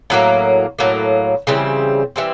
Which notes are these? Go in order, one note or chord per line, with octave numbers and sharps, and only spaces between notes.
A2 F#3 A#3
A2 F#3 A#3
C#3 E3 G3 C4
E3 G3 C4